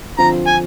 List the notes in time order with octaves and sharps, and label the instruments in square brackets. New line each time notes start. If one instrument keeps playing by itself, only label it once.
[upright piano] D3 F3 C4 F4 [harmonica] A#5
[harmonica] G#5